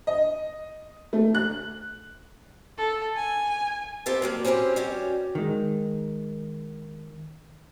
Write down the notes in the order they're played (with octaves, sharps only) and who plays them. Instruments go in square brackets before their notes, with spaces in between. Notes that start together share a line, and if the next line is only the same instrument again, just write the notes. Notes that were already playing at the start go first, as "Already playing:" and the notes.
[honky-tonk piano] D#5
A3
F#6
[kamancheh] A4
G#5
[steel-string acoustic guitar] C4 F4 G4 A4 B4 A5
F#3 G3 A#3
C4 C#4 G4 B4 C5
G3 C#4 F#4 G4
[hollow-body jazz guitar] D#3 G#3